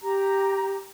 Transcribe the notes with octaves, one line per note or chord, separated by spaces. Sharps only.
G4 A#5